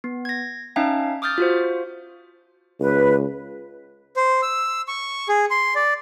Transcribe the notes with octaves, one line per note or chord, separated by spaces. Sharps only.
B3
G#6 A#6
C#4 D#4 E5 F5 G5 A5
D6 D#6 F6 G6 A6
F4 F#4 C5
C#2 B4
C5
E6
C#6
G#4
C6
D5